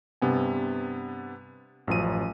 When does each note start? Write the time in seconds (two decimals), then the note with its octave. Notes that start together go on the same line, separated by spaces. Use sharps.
0.22 G2 C3 B3 G#5
1.87 A1 F#2 F3 D#7